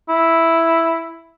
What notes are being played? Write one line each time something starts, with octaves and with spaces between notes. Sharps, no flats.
E4